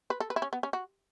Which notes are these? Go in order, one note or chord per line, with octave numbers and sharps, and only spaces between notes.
B4
A4
B4
E4
C#4
B3
C#4
F#4